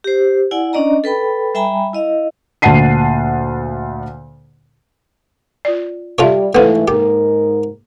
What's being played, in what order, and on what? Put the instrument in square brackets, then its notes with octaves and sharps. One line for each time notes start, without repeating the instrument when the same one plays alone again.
[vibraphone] G4 C5
E4 D5 F#5 G#5
C#4 D4 D5 D#5 A#5
A4 B4 G5 B5
G3 E5 G5 G#5 A#5 B5
E4 D#5 F5
[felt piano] D2 A#2 F#5 A5 C7 D#7
[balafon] F4 D5
[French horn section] G3 [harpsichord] F4 A4 C#5 [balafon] E5 F5
[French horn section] G#2 E3 A3 [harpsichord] B3 C4 [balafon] A4 B4 F5
[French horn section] G#2 A#4 [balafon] A#3 [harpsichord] G4